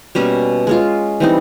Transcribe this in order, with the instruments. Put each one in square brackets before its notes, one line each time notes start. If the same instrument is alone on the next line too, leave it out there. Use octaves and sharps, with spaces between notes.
[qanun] B2 G3 A#3 C#4
G#3 C#4 F4
E3 G3 C4 D#4